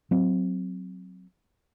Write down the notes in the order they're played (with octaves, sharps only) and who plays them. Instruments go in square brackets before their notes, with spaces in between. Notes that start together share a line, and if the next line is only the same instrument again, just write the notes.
[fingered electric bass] F#3 C4